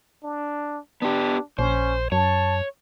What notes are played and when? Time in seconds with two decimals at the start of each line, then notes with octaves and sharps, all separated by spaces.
0.24 D4
1.02 B3 D4 G4
1.59 A#1 C#4 C5
2.12 F#2 C#5 A5